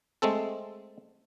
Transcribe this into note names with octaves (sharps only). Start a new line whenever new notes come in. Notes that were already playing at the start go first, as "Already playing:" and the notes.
G#3 A3 C4 A4